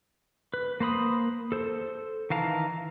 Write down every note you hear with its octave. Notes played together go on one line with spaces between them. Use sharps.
B4
A#3 C5 B5 D#6
A4 C5
D#3 E3 F5 A5 A#5